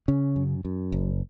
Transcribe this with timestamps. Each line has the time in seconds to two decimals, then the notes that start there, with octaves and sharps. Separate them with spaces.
0.08 C#3 C#4
0.36 F#2
0.65 F#2
0.92 F#1